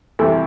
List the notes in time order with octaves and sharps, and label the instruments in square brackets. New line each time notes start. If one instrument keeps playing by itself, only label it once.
[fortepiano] C2 C3 E3 A3